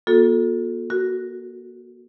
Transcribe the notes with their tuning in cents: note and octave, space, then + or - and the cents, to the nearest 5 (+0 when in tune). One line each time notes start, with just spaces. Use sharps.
A#3 +40 F#4 -45 A4 +0
F#4 +0 A#4 +0